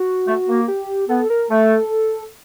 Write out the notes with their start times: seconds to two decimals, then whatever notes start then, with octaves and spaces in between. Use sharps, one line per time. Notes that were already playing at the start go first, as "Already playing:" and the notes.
Already playing: F#4
0.27 A3
0.47 A#3
0.68 G4
1.09 B3 A4
1.30 A#4
1.50 A3 A4